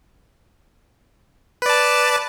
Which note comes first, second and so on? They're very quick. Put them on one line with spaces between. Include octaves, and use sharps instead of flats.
B4 D5 A5